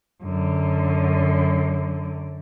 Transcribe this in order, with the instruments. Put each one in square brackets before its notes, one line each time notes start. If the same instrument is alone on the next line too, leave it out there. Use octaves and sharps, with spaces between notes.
[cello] F#2 D3